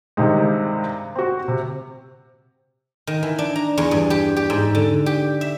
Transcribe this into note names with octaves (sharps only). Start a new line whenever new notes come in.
G2 C3 D#3 G#3
C4 F#4
C3
D#3
E3
D4
A#5
E2
G2
G4
G4
G#2
D3
G4
E5